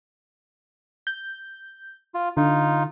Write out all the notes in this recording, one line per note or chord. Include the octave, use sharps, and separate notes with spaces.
G6
F4
D3 D#4 F4